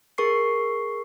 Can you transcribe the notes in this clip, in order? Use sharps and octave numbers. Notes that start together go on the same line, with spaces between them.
G#4 A#4 C#6 C7